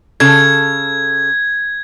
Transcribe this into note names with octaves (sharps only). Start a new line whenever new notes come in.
C#3 A4 G#6